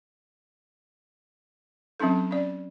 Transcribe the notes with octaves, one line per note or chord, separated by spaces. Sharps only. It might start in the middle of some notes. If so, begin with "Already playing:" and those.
F#3 C4 C#4 D#4 A4
C#4 D5